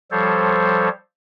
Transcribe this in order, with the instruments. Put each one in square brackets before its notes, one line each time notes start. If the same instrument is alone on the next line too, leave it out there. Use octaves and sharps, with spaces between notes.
[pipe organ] F3 G3 A4 C5 C#5